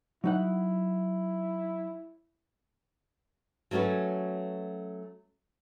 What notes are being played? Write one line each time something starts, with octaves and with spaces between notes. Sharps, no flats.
F#3 D#4 E4 F#5
F#3 A3 C#4 F#4 B4